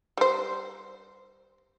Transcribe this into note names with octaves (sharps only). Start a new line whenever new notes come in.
G3 C5